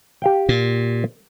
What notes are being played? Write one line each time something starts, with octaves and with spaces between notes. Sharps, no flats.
G4 F5 G5
A#2